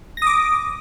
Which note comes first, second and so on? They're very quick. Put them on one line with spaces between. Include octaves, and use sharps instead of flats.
A#6 D#6 D6